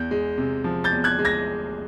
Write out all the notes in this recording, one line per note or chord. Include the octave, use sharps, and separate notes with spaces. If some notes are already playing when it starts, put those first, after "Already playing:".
Already playing: E2 G6
G#3
C3
F3
G6 A6
E2
F#6 G#6
G#3
G#6 A#6